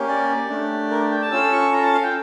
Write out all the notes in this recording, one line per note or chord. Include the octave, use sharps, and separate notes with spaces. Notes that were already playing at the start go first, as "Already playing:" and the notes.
Already playing: A#3 C#4 G4
D5
A3 D4 G4
A#4
D5
G5
A5
C#4 F4 A4 E6
C#6
A#5
A5
F5
G5